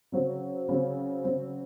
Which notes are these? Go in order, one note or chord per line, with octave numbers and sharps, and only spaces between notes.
C#3 F#3 C4
C#3 F#3 C4
C#3 F#3 C4